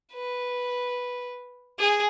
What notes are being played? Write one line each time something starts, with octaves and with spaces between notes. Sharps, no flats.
B4
G#4